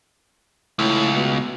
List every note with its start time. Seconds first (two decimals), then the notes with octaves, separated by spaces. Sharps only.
0.79 C#2 A2
1.16 B2